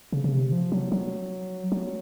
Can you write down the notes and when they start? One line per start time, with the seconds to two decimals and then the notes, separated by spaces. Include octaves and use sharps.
0.12 C#3
0.24 C#3
0.32 C3
0.52 F3
0.72 F#3
0.92 F#3
1.72 F#3